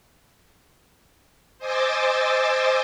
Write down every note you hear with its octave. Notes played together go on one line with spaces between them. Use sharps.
C5 D#5 G#5 D6 E6 A6